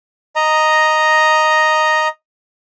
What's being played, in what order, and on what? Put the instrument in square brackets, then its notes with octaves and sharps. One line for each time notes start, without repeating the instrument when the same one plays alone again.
[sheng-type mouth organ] D#5 A#5